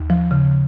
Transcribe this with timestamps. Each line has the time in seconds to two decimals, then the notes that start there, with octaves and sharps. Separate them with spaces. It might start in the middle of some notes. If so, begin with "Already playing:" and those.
Already playing: D#2
0.10 F3
0.31 C#3